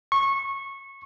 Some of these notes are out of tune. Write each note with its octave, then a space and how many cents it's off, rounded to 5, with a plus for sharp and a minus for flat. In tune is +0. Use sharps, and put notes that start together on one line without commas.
C#6 -20